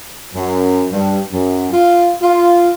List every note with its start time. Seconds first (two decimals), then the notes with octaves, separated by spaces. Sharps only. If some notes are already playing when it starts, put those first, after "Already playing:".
0.35 F#2
0.92 G2
1.32 F#2
1.71 F4
2.21 F4